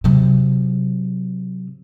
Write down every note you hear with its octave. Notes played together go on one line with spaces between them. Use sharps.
C3 F#3